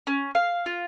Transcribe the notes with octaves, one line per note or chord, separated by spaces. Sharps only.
C#4
F5
F4